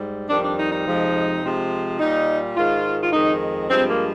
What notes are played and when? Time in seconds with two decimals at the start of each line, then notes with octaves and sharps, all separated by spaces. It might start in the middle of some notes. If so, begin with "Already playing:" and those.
Already playing: G#2 G3
0.29 F2 D#3 G3 D4
0.43 D4
0.58 D#4
0.71 D#4
0.85 F2 C3 F3 G#3
1.42 C3 F3 G#3
1.99 A#2 G3 D#4
2.56 G#2 D#3 G#3 F4
3.01 F4
3.13 F2 D#3 G#3 D#4
3.69 G2 F3 G#3 C4
3.89 A#3